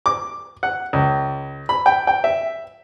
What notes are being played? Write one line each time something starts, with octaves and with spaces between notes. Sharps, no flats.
D6
F#5
C#2
B5
G5
G5
E5